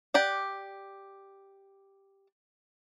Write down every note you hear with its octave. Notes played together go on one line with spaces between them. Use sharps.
G4 D5 F#5